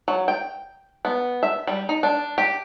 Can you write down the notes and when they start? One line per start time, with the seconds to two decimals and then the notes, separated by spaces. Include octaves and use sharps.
0.08 F#3
0.28 G5
1.05 B3
1.43 E5
1.67 G3
1.89 D#4
2.03 D4
2.38 G4